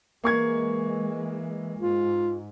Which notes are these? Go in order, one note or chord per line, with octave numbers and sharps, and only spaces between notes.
E3 G#3 A#3 C#6 G#6
G#2 F4